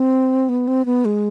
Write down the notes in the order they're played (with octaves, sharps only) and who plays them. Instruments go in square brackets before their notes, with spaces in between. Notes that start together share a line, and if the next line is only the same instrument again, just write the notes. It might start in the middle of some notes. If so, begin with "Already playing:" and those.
Already playing: [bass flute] C4
B3
C4
B3
G#3